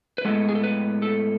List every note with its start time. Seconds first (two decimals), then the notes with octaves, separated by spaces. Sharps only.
0.18 B4
0.25 A2 G#3 B3 A4
0.49 G#4
0.55 A4
0.64 B4
1.02 A4